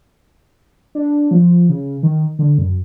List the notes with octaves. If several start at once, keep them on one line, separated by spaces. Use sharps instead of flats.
D4
F3
C#3
D#3
D3
F#2